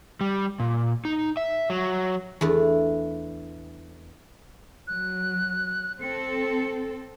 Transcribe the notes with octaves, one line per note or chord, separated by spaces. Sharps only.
G3
A#2
D#4
E5
F#3
E2 A3 D4
F#3 F#6
C4 A4 C#7